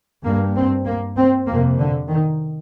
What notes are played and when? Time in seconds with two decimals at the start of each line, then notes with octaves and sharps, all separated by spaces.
0.24 G2 A#3
0.55 C4
0.85 A#3
1.16 C4
1.47 F2 C3 A#3
1.78 D3
2.08 D#3